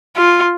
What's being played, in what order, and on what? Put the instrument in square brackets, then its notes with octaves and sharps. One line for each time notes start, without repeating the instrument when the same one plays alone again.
[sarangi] F4